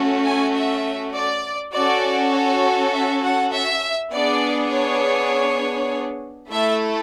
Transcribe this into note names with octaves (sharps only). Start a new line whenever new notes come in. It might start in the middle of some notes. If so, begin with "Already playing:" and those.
Already playing: A3 C#4 F#4
G#5
E5
D5
C#4 F#4 A4 D5
C#5
E5
F#5
E5
B3 D4 G#4 D5
C#5
A3 E4 A4 E5